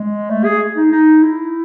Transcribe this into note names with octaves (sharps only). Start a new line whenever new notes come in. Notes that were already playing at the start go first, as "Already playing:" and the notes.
Already playing: G#3
A3
G#4
D#4
D#4
E4